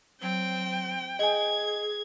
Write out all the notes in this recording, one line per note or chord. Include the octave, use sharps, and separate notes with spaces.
F#3 C4 G5
G#4 D#5 G#5 G#6